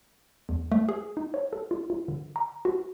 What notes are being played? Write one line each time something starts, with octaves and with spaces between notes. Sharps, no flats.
E2
A3
G#4
D#4
C#5
A4
F4
F4
D3
A#5
F#4